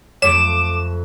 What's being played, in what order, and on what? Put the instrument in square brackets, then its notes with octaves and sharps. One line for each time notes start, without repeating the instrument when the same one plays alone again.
[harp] F2 A3 A4 [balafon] C#5 [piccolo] D6 [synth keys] E7